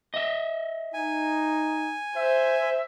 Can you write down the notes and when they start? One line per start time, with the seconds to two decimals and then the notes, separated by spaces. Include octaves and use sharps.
0.14 D#5 E5
0.94 D#4 G#5
2.16 C5 E5